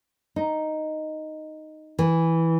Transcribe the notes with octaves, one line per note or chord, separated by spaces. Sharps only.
D#4
E3